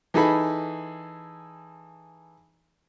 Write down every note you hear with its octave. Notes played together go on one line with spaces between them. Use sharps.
E3 D#4 G#4 A4 B5